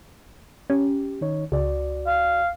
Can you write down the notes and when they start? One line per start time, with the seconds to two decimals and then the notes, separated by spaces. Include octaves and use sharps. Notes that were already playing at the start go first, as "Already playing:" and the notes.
0.70 C#4 G4
1.21 D#3 D#4 C#5
1.52 C#2 F#4 D5
2.07 F5